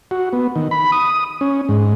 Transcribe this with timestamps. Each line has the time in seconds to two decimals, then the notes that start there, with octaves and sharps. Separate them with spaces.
0.11 F#4
0.33 B3
0.56 D#3
0.71 B5
0.92 D#6
1.41 C#4
1.69 G#2